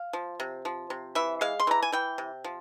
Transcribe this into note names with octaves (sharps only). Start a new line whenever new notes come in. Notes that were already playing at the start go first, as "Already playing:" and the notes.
Already playing: F5
F3
C3
F3
C3
E3 E5
G#3 F5
C6
E3 A#5
G#5
E3 G5
C3
F3